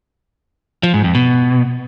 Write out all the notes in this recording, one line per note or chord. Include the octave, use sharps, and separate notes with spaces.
F3
G#2
F2
B2